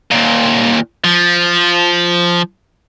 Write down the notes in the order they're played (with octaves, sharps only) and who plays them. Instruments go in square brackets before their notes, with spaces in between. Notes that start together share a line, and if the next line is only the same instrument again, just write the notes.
[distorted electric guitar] D#2 A#2
F3